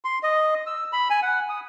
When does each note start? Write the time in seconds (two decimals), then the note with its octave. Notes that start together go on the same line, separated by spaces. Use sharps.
0.05 C6
0.23 D#5
0.67 E6
0.93 B5
1.10 G#5
1.22 F#5
1.49 D#6